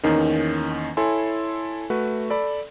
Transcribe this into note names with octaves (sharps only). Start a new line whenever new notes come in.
E2 D#3 A#3 C#4 D#4
E4 A4 C#5 G#5 C6
A3 F#4 B4
A4 D5 B5